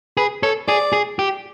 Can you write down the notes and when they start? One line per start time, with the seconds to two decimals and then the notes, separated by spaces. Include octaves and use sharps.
0.17 G#4 B4
0.43 A4 C#5
0.68 G#4 D5
0.93 G#4
1.19 G4